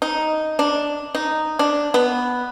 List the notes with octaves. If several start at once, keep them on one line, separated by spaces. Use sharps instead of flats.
D#4
D4
D#4
D4
B3